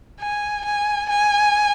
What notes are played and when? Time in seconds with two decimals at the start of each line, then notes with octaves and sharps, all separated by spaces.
0.20 G#5
0.65 G#5
1.09 G#5